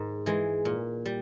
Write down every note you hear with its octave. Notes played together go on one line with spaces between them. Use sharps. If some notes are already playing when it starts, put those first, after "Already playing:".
Already playing: G#2 D#3 G#3
E3 G#3
A#2
G3